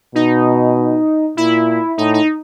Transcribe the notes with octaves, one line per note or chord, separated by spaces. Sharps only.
B2 D#4
A#2 E4
A2 D#4
D#4